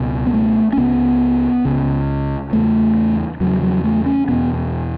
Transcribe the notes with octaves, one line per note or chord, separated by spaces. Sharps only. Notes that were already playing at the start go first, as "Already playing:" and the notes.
Already playing: C#2 B2
B3
A3
C#4
C#2 C#3 B3
C#2 C#3
E2 C#3 A3
E2 C#3 F#3
F#3
A3
C#4
E2 B2 B3